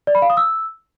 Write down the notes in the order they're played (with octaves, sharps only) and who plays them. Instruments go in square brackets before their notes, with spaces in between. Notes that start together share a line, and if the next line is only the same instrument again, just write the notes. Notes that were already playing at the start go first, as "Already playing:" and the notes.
[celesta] D5
B5
F5
D#6
E6